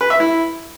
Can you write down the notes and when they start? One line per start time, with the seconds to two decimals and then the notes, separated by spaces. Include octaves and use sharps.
0.01 B4
0.10 E5
0.20 E4